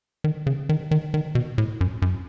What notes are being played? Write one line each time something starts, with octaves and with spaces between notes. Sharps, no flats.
D#3
C#3
D#3
D#3
D#3
B2
A2
F#2
F#2